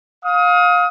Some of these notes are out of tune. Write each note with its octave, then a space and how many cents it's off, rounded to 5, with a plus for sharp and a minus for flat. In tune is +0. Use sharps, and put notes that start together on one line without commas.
F5 +30 D#6 +30